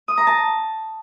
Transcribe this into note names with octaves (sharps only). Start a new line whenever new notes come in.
D#6
A#5
A5